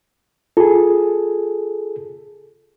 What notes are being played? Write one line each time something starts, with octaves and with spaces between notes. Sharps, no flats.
F4 G#4 A4